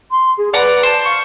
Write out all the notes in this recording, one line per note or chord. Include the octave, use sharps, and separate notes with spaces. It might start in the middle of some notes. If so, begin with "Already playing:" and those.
C6
G#4
B4 D5 F#5 A#5 D6
C5 A5
F5 C#6